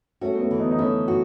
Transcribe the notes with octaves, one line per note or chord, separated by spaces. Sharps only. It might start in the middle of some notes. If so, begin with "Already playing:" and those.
A3 C#4 F#4
B3
A3 C#4
E3
B3 D#4
D#4
E3 A3 C#4
F#4